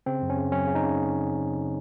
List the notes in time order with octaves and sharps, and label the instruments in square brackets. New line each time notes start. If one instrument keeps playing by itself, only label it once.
[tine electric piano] C#3 C4
F#2
C#4
C#3
F#3 C#4
C#3
D#4
C#3